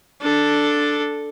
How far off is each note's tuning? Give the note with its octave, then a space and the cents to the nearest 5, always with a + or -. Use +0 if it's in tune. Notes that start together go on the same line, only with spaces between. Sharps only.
D4 +0 A4 +0